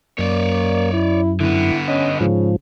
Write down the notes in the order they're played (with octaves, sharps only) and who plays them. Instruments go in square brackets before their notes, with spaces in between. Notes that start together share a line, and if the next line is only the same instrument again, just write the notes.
[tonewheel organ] F#2 [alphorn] A#3 [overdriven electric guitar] C#5 D5
[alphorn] E4
[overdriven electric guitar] D3 B3 [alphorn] E4
[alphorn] C#4 [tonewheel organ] D#5
[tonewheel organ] G#2 F3 [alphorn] C#3